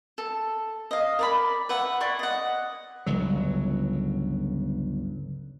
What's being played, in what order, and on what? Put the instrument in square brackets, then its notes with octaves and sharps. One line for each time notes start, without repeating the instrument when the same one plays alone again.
[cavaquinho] A4
D#5 F5
A#4 D5 B5
B4 E5 F#5
E4 D5 C6 C#6
D#5 F#5
[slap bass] G1 C#2 F#3